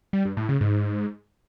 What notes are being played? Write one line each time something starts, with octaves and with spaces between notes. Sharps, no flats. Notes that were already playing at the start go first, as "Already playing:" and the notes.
G3
G2
A2
C#3
G#2